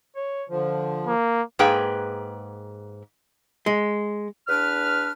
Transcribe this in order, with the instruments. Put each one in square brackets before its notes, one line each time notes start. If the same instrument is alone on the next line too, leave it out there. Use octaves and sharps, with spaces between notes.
[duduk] C#5
[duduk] D3 [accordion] F3
[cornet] A#3
[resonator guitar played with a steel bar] G#2 A#3 G#4 B4 G5
[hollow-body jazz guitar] G#3
[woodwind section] E2 D4 B4 F6